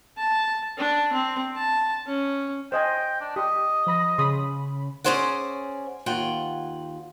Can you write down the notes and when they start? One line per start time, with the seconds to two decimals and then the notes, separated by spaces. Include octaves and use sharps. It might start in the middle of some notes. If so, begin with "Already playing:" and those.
0.17 A5
0.78 D4
1.13 C4
1.56 A5
2.07 C#4
2.72 C5 D#5 G5 G#5
3.20 D4
3.36 G4 D#5
3.86 F3 B5 A#6
4.18 C#3 B5 C6 D#6
5.04 C#4 D4 G#4 C5 D5 F#5
6.06 D#2 F4 F#5 G5